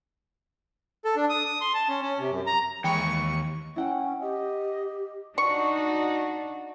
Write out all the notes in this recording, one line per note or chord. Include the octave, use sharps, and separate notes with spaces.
A4
D4
D#6
D#6
C6
A5
C#4
C#4
C3
F#2
A#5
D#2 E3 G#3 C#5 G5 B5 C#6
C#4 E4 F#5 G5
G4 D#5
D4 D#4 F#4 C#6